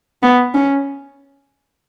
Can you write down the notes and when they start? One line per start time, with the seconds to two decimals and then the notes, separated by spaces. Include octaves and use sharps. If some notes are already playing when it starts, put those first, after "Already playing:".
0.23 B3
0.54 C#4